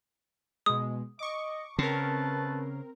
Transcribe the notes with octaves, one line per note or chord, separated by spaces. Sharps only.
B2 G#3 D#6
D#5 C#6 D6
C#3 A3 C4 A#4 B4 A5